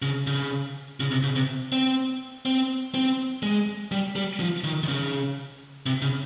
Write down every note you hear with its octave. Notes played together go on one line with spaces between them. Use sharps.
C#3
C#3
C#3
C3
C#3
C3
C4
C4
C4
G#3
G3
G3
F3
D#3
D#3
C#3
C3
C#3